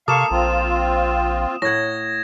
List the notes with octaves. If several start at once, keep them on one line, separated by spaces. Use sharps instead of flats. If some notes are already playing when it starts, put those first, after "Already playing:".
C3 A#3 A4 F5 C#6 D#6 E7
A#1 C4 F4
A2 F#5 G#6 A#6